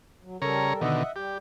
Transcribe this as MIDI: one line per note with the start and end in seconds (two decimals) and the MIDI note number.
0.22 0.37 54
0.42 0.73 49
0.42 0.81 55
0.42 0.81 69
0.42 0.81 70
0.42 0.73 73
0.42 0.73 82
0.81 1.03 47
0.81 1.03 50
0.81 1.03 51
0.81 1.12 75
0.81 1.12 76
0.81 1.12 78
1.16 1.38 55
1.16 1.38 67